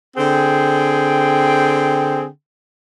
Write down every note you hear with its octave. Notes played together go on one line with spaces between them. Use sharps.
D3 C4 G#4 G5